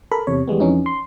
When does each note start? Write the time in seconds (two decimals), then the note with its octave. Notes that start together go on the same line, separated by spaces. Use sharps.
0.12 A4 A#4 B5
0.27 E2 C3 C#5
0.48 E2 G3 G#3 B3
0.60 F2 E3 C#4 D#4
0.86 C6